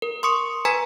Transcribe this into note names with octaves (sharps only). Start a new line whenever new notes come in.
A#4
C6 C#6 D#6 C#7
B4 G#5 A#5 G#6 B6